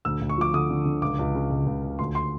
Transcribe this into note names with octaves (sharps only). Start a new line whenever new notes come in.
D2 E6
D2
C#6
F3 D6
D3 D#6
D3
D3
C#2 D6
C#2
C#3
C#2
C#2
C#2
D2 C6
C6